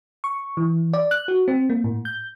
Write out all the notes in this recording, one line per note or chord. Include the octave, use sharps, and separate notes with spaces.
C#6
E3
D5
F#6
F#4
C4
A#3
A2
G6